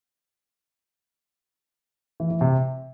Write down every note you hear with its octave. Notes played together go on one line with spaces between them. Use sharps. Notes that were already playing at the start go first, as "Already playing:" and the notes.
E3
E3
C3